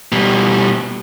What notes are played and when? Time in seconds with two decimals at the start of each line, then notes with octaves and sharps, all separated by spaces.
0.12 B2 G3